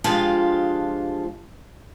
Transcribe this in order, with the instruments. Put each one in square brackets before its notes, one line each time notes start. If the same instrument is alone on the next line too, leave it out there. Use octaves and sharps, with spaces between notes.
[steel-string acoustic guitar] F3 G#3 D4 F4 G4 F5